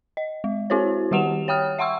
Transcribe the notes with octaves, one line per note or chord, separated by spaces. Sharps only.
D#5
G#3
C4 E4 F#4 C5 C#5
D#3 G3 G4 F#5 E7 F7
C#5 G5 D#6 F6
E5 F#5 C6 C#6 E6